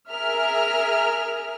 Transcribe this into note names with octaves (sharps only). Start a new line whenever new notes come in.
G#4 A#4 E5 F6